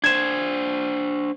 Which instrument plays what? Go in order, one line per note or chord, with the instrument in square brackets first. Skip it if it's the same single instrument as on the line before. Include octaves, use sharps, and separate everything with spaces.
[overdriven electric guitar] D4 C5 [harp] G#6 E7